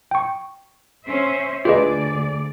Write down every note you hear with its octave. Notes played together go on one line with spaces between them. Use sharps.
G5 C#6
C#4 C5 E5
D2 F4 G#4 B4 D5 D#5